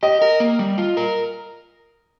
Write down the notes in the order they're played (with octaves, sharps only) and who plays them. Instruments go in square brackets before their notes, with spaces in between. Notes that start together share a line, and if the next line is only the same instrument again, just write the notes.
[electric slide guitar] G4 [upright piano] D#5
[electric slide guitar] A#4
A#3
G3
F4
A#4